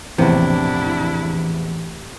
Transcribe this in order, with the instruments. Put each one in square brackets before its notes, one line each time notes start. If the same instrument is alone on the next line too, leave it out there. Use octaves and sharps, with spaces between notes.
[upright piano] A#1 E2 [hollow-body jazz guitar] A2 C3 [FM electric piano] E3 [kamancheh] D4 E4